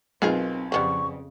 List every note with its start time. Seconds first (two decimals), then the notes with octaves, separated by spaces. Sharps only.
0.22 B1 D#3 C4 F4 G#4 A#4 B4
0.72 F2 C#3 G3 B3 C4 C#6